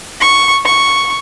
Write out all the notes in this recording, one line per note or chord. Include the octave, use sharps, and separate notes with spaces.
C#6
C#6